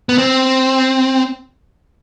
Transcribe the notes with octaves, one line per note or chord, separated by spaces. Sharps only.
B3
C4